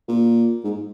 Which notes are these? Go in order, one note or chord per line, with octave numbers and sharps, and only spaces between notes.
A#2
G#2